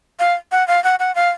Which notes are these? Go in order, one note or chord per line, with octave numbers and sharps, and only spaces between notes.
F5
F#5
F5
F#5
F#5
F5